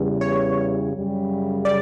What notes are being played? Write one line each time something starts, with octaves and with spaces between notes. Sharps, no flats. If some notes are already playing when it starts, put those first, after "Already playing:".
Already playing: E2 C#3 G3
C#5
F#2 C#3 G3
D5